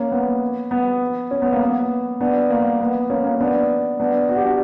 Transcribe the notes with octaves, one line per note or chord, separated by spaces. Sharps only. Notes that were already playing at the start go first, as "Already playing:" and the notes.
Already playing: A#3 C#4
B3
B3
C#4
B3
A#3
B3
B3 D4
A#3
B3
A#3 C#4
A#3 C#4
B3 D4
B3 D4
F#4
G4
D4 F#4